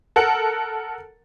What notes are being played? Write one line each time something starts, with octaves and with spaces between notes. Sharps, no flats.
A4 A#4 F#5